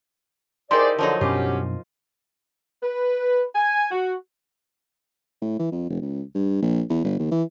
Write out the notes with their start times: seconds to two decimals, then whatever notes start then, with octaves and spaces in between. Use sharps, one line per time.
0.71 D#4 E4 G4 G#4 A#4 C5 D5 C6
0.98 D3 F3 F#3 D#4
1.21 F#2 B2 F#3 C#4 D4 F4 G4
2.83 B4
3.55 G#5
3.91 F#4
5.42 A2
5.59 E3
5.72 F2
5.90 F1
6.02 C#2
6.35 G2
6.62 A#1
6.90 E2
7.04 G1
7.19 D#2
7.31 E3